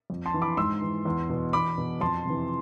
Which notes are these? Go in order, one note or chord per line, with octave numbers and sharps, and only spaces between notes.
F2
A5 C6
E3
B5 D6
G#2 C6 E6
E3
E2
B2
E2 B5 D6
B2
F2 A5 C6
C3 E3